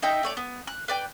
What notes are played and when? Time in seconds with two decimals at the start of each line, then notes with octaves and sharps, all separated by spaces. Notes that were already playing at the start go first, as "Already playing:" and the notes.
0.02 D#4 D#5 E5 G5
0.23 A3 C#5 D5
0.37 B3
0.67 F#6
0.88 B4 D5 G5